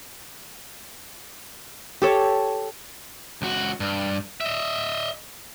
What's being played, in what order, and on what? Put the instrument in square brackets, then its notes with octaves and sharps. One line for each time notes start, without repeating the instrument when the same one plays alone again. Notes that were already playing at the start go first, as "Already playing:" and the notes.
[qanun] G4 A4 C#5
[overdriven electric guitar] C#2 F#4
G2
D#5 E5